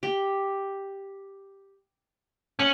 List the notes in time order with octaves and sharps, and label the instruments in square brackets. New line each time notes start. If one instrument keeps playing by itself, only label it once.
[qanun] G4
[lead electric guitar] C#4 [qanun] F#5